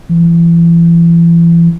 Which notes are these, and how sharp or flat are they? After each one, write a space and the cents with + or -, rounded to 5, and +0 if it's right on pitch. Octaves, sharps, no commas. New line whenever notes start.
E3 +35